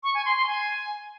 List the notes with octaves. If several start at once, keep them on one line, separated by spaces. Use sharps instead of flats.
C#6
G#5
C6
C6
G#5